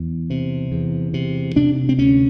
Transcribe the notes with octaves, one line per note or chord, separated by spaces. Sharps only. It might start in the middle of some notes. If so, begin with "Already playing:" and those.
Already playing: E2
C3
E2
C3
C3 D4
C4
D2 C#4